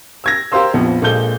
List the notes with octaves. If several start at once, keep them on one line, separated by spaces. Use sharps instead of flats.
E6 G#6 A#6
G4 A#4 C5 F5 C6 E6
A#1 F2 F3 B3
A#1 A#2 G#3 A4 G6 G7